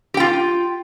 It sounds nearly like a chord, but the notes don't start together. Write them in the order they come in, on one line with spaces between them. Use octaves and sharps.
G4 G5 F4